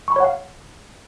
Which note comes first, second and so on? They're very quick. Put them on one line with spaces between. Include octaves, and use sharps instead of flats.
C#6 B5 C#5 F#5 F5